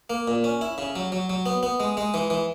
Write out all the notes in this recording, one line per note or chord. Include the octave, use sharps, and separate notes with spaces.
A#3
A#2
C#4
E4
C#3
F#3
F#3
F#3
B3
B3
G#3
G#3
E3
E3